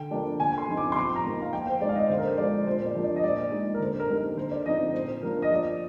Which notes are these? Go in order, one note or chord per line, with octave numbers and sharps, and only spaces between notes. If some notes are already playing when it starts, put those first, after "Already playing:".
Already playing: D3 G5
F3 A#3 D4
D3 G#5
C6
F3 C4 D#4
D6
C6
F3 D6
A#5
A#3 D#4
F5
F3 G5
C5
G#3 D#4 D5
F5
D#5
D3 C5
A#4
C5
F3 G#3 D4 D5
A#2 C5
D5
F3 A#3 D4
D5
D#5
A#2 D5
G#3 D#4
A#4
D3 C5
A#4
G3 A#3 D#4
A#4
D3 C5
D5
F3 C4 D#4 D#5
A#2 C5
F3 A#3 D4 F4 A#4
D#5
F3 D5